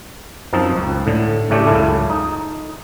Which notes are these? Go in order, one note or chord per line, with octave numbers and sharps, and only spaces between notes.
F#2 F3 C4 D#4 A5
C#2
A2 D3
A2 C#3 A3 D4 G4 A4
C#2 F#2 C#3 E4 F4 A4
D#4